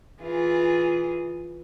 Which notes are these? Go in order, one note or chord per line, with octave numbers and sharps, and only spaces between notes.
E3 F4 G#4